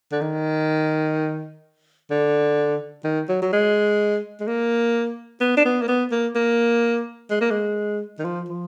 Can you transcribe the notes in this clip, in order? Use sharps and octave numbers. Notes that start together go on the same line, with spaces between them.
D3
D#3
D3
D#3
F#3
F#3
G#3
G#3
A#3
B3
D4
B3
A#3
B3
A#3
A#3
G#3
A#3
G#3
D#3
F3
F3